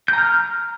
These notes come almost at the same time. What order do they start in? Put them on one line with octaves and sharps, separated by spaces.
G6 A#5 F6